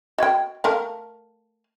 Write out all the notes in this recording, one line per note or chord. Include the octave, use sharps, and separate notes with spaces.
F#4 D#5 G5 G#6
A3 A#4 F5 G5 A5